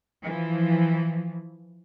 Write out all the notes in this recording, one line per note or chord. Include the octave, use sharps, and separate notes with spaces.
E3 F3